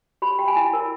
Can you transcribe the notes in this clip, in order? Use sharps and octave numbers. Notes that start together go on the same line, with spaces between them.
G4 B5
G4 G5
G#5
E4
A#4